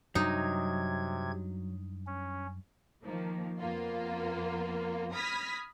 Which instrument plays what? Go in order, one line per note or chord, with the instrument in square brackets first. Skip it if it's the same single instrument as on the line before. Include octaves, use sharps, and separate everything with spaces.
[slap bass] F#2 G3 D4 [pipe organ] C3 G#6 [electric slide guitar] F#3 [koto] D#4
[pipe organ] C#4
[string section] D#3 F3 A#3
F2 A#3 B3 F4
B5 D#6 F6 G#6 A#6 B6